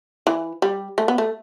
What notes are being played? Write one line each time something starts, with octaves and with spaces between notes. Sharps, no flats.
E3
G3
A3
B3
A3